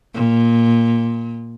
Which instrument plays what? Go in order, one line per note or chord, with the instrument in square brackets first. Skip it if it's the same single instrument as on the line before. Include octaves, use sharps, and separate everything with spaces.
[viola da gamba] A#2